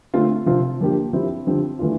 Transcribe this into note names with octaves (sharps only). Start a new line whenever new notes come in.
D3 A3 C4 F4
C3 F3 C4 F4
D3 F3 A#3 D4 G4
F3 C4 E4 G4
D3 F3 C4 G4
E3 A3 D4 F4